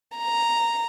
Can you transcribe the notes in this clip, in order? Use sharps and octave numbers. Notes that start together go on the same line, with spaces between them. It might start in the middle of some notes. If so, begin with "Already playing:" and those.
A#5